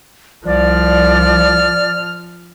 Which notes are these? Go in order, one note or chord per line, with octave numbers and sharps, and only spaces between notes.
C2 F3 D5 F6